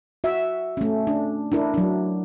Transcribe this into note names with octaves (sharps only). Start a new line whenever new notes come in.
F#4 E5
A3 C#4
D4
D4 E4 A#4
F#3 D4